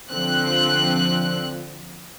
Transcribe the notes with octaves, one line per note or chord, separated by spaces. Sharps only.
D3 F3 C4 F#6